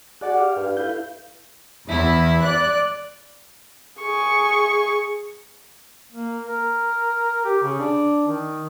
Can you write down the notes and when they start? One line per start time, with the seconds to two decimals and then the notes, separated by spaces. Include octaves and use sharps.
0.21 F#4 G#4 D5 F#5
0.38 G4 F5
0.55 G2
0.77 A3 E4 B4 F5 G6
1.87 E2 E4
2.45 D5 F#6
4.01 G#4 C#6
6.12 A#3
6.47 A#4
7.45 G4
7.63 C#3
7.79 D4
8.27 D#3